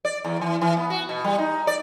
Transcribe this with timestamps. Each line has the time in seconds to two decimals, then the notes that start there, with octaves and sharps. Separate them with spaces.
0.05 D5
0.24 E2
0.41 E3
0.61 E3
0.77 B3
0.90 F#4
1.09 B2
1.24 G3
1.38 D#4
1.67 D5